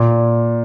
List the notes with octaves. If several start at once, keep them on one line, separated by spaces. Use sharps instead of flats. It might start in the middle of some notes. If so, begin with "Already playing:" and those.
Already playing: A#2